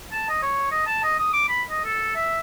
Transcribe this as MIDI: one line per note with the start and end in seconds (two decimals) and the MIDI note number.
0.12 0.25 81
0.29 0.39 75
0.43 0.70 73
0.71 0.82 75
0.86 1.01 81
1.03 1.15 75
1.19 1.31 87
1.33 1.48 86
1.48 1.62 83
1.70 1.84 75
1.85 2.14 69
2.15 2.40 76